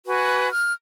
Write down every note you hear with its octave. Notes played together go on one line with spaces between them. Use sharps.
F#4 B4 G#5
F6